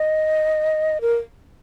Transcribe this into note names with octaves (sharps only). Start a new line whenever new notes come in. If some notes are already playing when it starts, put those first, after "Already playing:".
Already playing: D#5
A#4